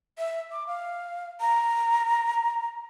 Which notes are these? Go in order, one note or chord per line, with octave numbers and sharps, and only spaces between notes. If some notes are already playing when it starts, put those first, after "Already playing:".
E5
D6
F5
A#5